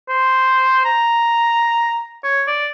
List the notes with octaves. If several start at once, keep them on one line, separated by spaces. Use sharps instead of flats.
C5
A#5
C#5
D5